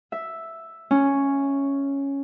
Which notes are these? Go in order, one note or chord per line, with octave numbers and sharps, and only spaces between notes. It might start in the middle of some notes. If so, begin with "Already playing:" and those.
E5
C#4